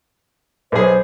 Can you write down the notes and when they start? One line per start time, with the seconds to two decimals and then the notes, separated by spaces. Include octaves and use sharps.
0.72 B1 G#4 C5